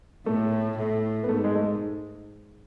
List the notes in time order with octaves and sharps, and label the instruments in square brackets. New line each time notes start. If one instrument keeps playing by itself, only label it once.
[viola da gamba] A2 [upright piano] A3
[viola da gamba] A2
[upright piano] B3
[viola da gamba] G#2 [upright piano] A3
[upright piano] G#3
A3